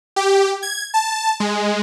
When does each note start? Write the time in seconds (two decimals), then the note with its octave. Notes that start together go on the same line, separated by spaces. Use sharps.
0.16 G4
0.62 G#6
0.94 A5
1.40 G#3